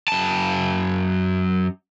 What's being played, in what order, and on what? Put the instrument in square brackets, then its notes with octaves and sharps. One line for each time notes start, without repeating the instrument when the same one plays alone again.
[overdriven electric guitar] F#2 A5